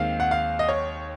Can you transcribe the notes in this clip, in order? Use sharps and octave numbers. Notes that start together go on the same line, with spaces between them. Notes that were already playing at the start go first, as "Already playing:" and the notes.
Already playing: D#2 D#3 G#3 C4 F5
F#5
F5
D#5
C#5